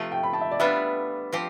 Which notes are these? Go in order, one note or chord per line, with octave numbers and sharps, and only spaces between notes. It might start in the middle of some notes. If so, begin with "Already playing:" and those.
Already playing: C3 F3 A3
G5
B5
A5
E5
D5
G3 B3 D4 F4 E5
F3 C4 G4